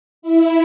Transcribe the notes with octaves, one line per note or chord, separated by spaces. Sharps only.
E4